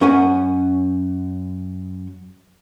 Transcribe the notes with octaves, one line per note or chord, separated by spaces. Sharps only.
F#2 C#4 A#4 F#5 G#5